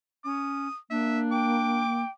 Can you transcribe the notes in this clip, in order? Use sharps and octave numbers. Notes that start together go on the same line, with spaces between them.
C#4 D#6
A#3 D4 E5
G5 D6